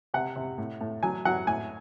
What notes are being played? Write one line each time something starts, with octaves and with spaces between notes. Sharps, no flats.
C3 F#5
C3
A2
A2
F#3 G#5
F#3 F#5
A2 G#5